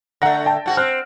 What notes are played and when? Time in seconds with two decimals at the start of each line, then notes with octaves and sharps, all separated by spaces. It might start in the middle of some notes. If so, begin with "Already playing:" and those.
0.22 D3 A3 F#5 A#6
0.46 G5 A5
0.66 G#2 F#4
0.77 C4 F6 F#6